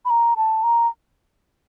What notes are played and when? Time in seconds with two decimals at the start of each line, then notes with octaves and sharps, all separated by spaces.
0.05 B5
0.10 A#5
0.37 A5
0.63 A#5